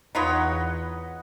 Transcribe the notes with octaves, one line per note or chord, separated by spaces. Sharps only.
E2 D#4 F4 B4 C#5 D#5 F#5